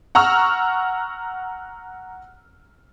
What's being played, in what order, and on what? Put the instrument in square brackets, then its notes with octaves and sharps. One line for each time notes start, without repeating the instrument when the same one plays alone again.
[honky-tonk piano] F#5 A#5 C#6 E6 F6